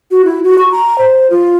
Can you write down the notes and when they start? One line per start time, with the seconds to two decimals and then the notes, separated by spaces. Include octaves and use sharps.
0.11 F#4
0.25 E4
0.44 F#4
0.58 C#6
0.71 A#5
0.98 C5
1.30 F4